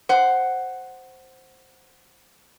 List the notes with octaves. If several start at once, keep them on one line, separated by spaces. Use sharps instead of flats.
C5 F#5